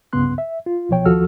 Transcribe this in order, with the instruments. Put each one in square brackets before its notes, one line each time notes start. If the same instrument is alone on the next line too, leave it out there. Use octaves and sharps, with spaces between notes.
[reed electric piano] C2 G2 C#3 B3 C6 F#6
E5
F4
C2 B2 F3 C#5 G5
D#2 F3 F#4 A4 E6 F6